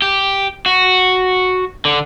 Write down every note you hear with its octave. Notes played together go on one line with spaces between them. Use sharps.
G4
F#4
D3